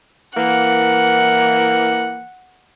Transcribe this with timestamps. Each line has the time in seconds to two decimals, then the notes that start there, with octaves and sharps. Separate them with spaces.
0.37 E3 A#3 F#5